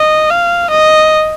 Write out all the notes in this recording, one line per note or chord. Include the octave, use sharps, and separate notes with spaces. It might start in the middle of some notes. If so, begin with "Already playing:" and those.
Already playing: D#5
F5
D#5